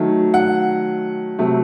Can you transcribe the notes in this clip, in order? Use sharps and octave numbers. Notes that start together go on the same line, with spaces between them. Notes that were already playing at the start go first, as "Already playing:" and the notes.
Already playing: D#3 F#3 A3
F#5
C3 F#3 A3